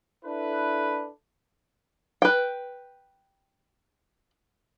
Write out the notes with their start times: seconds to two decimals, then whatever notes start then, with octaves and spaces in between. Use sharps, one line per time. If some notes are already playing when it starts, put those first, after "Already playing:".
0.24 D4 E4 A4 B4
2.22 B4 G5